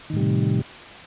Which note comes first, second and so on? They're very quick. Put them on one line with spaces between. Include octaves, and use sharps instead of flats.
D#3 A2 G3 C3